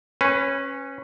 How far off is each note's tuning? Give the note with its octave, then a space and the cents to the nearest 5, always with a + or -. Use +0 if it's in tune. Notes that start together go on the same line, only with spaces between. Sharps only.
C#4 -15 B4 +15